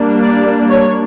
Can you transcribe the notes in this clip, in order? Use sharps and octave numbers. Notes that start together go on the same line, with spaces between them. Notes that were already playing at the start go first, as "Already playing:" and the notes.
Already playing: G3 A#3 D4
D5
C#5